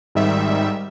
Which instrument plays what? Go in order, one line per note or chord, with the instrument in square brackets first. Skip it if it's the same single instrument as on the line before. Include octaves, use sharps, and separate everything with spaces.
[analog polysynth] G#1 G#2 D#3 G3 E5